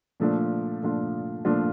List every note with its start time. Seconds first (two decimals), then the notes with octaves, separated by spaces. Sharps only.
0.20 A#2 F3 A3 D4 F4
0.82 A#2 F3 A3 D4 F4
1.45 A#2 F3 A3 D4 F4